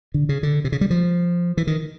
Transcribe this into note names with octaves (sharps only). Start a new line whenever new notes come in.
D3
C#3
D3
C3
C#3
G3
F3
E3
D#3